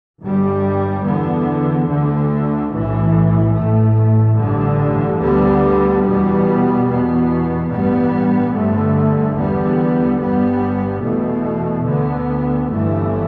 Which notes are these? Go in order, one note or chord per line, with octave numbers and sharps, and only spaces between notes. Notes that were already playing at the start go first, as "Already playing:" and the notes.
G1 G2 G3
E2 D3 B3
D2 D3 A3
B1 A2 E3
A1 A2 A3
A1 G2 D3
D2 D3 G3 B3
E2 B2 G3 B3
E2 B2 B3
A1 G2 G3 B3
G1 G2 D3 A3
E2 D3 G3 B3
G1 G2 G3 B3
E2 B2 A3
D2 D3 B3
G1 G2 E3 A3